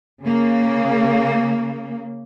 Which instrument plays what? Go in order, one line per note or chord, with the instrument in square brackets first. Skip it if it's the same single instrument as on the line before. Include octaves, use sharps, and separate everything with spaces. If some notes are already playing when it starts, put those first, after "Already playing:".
[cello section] C#3 A#3